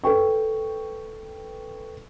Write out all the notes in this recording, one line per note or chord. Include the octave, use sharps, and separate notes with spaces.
A4 B4 G5 C#6